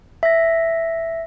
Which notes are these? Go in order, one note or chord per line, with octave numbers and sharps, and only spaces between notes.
E5 A#6